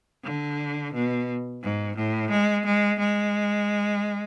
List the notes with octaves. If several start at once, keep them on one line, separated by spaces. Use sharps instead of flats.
D3
B2
G#2
A2
G#3
G#3
G#3